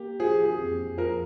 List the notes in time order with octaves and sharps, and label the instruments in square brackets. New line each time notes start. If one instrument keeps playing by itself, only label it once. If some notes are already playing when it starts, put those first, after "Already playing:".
Already playing: [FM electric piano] A#3 [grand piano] G4
[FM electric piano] F3 [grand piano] G#4
[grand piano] G#4
[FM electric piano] F2
[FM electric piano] F3 [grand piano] A#4